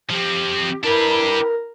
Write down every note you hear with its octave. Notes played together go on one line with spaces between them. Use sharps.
F3 C4 G4
D4 E4 G4 A#4 B4